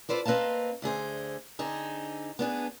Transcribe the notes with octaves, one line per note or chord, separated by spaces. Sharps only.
F4 A4 B4 C5 D5
A#3 C4 B4 D#5 F5 A5
D2 D3 G#4 C5
D3 C4 D#4 G#4
B3 D4 G#4